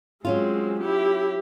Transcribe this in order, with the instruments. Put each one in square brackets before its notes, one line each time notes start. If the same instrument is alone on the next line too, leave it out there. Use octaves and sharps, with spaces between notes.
[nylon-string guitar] F#3 C#4 F4 [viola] G#3 C4
[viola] E4 G4